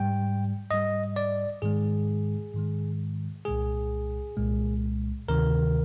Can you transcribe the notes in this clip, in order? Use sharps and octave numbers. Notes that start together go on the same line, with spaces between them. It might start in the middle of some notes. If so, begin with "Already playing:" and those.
Already playing: G#2 G3 G5
G#2 G3 D#5
D5
G#2 D#3 G#3 G#4
G#2 D#3 G#3
C2 A#2 G#3 G#4
C2 A#2 G#3
D2 C3 D#3 A#4